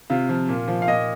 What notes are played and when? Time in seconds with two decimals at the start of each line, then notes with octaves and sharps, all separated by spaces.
0.10 C3 F4
0.29 F3
0.49 A#2
0.68 F3
0.82 F5
0.88 A#2 D#5